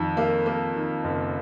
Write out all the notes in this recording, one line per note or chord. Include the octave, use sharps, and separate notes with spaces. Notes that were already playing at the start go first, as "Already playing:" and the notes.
Already playing: F2 D#3
A#3
A#3
D#3
F#1